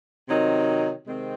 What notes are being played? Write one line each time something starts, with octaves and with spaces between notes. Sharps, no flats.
C3 D#3 F#3 C4 D#4
C3 D#3 G#3 C4